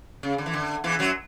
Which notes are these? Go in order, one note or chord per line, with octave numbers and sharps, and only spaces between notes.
C#3
D3
E3
D3
E2 E3
F#2 F#3